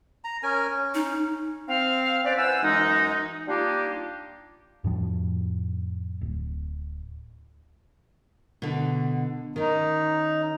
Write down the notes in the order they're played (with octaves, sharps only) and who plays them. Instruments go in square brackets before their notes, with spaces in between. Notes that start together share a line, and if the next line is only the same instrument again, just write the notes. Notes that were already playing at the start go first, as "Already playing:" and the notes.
[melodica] A#5
C#4 A#4 G#5
C#4
[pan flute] D#4
[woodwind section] C4 F5
C#4 B4 C5 D5
E3 C5 F#5 G#5 E6
F#2 E3 G#3 D#4
G3 A#3 D4 D#4 F4 G4
[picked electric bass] F2 A2 F3
D1
[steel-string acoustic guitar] B2 D3
[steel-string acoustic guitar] D#3 C#4 [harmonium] D#4